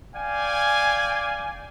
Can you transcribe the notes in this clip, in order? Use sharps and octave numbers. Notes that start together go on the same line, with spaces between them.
D5 F5 G5 G#5